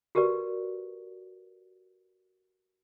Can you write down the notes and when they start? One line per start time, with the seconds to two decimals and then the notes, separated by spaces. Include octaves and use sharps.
0.15 F#4 G4 A#4 B4 D5